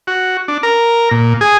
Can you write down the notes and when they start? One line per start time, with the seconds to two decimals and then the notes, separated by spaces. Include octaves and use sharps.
0.07 F#4
0.48 D4
0.63 A#4
1.11 A#2
1.41 G#4